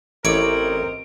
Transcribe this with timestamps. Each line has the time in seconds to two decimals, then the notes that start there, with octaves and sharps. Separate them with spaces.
0.25 A1 C4 D#4 E4 A#4 C#5 D5 D7